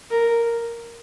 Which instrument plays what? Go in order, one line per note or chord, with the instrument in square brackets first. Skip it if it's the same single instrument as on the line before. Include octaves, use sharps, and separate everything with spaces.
[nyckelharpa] A#4